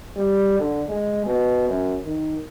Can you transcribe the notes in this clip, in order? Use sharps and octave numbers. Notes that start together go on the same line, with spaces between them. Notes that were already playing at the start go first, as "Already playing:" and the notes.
G3
D3
G#3
B2
F#2
D#3